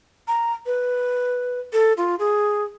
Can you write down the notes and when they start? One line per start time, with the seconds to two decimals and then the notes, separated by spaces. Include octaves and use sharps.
0.28 A#5
0.66 B4
1.73 A4
1.97 F4
2.19 G#4